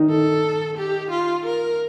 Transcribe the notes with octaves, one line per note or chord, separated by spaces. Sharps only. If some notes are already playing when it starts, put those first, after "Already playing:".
Already playing: D#3 D#4
A4
G4
F4
A#4